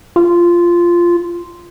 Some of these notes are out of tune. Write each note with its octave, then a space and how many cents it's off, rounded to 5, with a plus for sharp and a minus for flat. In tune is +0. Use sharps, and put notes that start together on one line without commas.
F4 -10